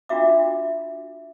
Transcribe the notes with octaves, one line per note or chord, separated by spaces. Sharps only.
D4 F4 F#4 E5 D6